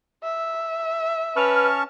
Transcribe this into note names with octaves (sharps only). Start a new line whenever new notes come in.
E5
C#4 B4 A5 C#6 F6